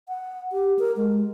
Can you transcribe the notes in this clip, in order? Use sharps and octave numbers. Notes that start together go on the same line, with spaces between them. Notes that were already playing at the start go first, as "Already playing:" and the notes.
F#5
G4
A#4
G#3